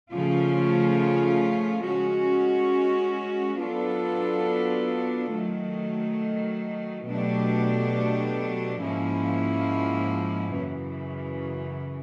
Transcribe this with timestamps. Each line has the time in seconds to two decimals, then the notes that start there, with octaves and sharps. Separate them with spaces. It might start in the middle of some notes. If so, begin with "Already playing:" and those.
0.11 C#3 F3 A3 C#4 F4
1.85 G#3 C#4 F#4
3.59 F#3 B3 D4 F4 A4
5.33 D#3 F#3 A3
7.06 B2 F#3 A3 D4 G4
8.80 G#2 F3 A#3 C#4 E4
10.53 F#2 C#3 E3